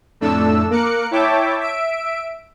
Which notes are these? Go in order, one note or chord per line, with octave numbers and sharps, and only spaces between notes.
F2 A2 A3 D4 A4 E6
A#3 A#4 D6 F#6 C#7
E4 C#5 E5 G5 A5 D6
E5 D7